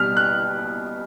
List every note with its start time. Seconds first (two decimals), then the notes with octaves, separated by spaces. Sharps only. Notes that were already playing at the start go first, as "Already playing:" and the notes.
Already playing: B2 G3 F6
0.17 F#6